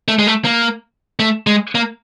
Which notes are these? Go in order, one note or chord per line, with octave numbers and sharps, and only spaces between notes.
A3
G#3
A3
A#3
A3
G#3
A#3